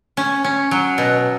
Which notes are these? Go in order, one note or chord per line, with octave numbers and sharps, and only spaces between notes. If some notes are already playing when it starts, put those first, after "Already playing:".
C#4
C#4
F#3
B2